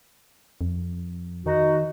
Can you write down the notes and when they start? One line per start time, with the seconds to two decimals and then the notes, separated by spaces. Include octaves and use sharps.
0.61 F2
1.46 D#3 D#4 F#4